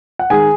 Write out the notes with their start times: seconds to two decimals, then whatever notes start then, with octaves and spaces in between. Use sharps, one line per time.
0.19 F#5
0.30 D#3 G#3 G#4 G#5